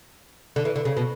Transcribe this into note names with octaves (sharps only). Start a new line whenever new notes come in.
D3
E3
D3
C#3
B2